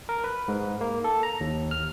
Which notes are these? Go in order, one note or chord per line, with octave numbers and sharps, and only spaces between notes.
A#4
B4
G#2
A#3
A4
A#5
D#2
F6